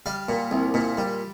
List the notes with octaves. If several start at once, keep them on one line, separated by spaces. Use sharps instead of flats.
G3 F5
A#2
C2
A#2
G3